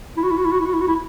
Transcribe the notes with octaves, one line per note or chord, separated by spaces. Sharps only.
E4
F#4
E4
F#4
E4
F#4
E4
F#4
E4
F#4
E4